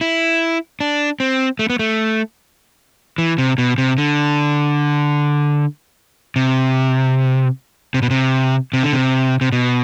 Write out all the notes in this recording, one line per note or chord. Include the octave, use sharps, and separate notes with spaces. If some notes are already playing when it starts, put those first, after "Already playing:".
E4
D4
C4
A3
B3
A3
E3
C3
B2
C3
D3
C3
C3
B2
C3
C3
D3
C3
C3
B2